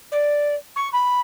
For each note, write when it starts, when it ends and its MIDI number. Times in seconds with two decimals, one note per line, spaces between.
0.11 0.54 74
0.76 0.88 85
0.93 1.20 83